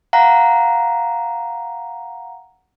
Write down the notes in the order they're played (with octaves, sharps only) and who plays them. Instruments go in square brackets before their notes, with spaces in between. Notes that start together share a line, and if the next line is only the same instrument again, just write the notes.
[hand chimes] F5 F#5 A#5